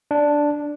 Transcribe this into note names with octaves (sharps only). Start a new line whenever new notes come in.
D4